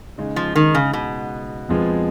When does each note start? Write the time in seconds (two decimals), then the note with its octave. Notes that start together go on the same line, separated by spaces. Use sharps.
0.18 C#3 G#3 D#4
0.36 F3
0.56 D#3
0.75 C#3
0.93 B2
1.69 F2 F3 G#3 B3 F4